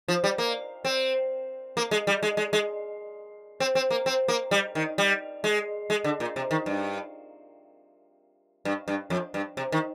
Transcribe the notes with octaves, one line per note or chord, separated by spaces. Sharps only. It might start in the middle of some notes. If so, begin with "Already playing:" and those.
F3
G3
A#3
C4
A#3
G#3
G3
G#3
G#3
G#3
C4
C4
A#3
C4
A#3
G3
D#3
G3
G#3
G#3
D3
A#2
C3
D#3
G2
G2
G2
F2
G2
C3
D#3